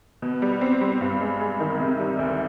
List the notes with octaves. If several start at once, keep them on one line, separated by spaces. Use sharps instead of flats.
B2
G3
C4
G3
G2
G#3
G#3
D#3
C3
G3
D2